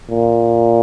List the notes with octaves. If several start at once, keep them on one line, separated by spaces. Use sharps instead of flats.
A#2